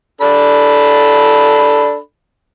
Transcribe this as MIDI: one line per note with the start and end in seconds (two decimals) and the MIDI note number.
0.21 1.98 62
0.21 1.98 69
0.21 1.98 83